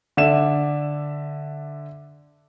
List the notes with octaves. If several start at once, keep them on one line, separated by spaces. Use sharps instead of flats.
D3 D5 E5 E7